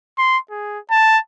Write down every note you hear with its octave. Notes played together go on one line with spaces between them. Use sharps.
C6
G#4
A5